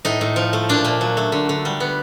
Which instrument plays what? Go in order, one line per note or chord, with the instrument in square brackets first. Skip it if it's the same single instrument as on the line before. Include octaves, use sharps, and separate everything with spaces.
[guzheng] A2 D#4
A2
F3
A3
A#2 D4
A#2
F#3
A3
D3
D3
G3
B3